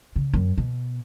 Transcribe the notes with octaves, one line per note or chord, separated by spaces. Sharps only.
C#3
F#2
B2